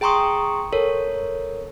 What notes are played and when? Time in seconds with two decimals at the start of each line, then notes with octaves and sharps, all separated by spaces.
0.01 G#4 G5 A#5 C6 C#6 D#6
0.73 A4 A#4 C#5